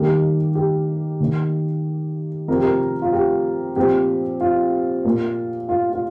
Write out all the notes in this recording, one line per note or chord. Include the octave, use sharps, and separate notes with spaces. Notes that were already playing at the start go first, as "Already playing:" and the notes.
Already playing: D#3 G3 A#3 G4
G4
D#3 A#3
C3 F3 C4 A#4
G4
A#4
F4
G4
A#2 F3 C4 G4
F4
A#2 A#3
F4
F4